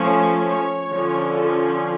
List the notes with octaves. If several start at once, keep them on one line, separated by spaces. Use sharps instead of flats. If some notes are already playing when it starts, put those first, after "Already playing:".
Already playing: F3 A3 C#4 C#5
C#5
D3 F3 C#4
A4